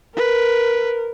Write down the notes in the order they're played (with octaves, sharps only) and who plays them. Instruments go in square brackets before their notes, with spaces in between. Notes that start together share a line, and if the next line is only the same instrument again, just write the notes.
[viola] A#4 [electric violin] B4